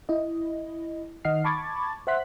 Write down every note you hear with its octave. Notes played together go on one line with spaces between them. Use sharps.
E4 D#5
D#3 D#5 F#5 F6 C7
A5 B5 C#6 D6 G#6 A6
C5 E5 F#5 C6 F#6 B6